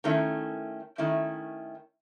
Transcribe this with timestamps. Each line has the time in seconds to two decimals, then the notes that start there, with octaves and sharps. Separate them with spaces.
0.04 D#3 A3 C#4 E4
0.98 D#3 A3 C#4 E4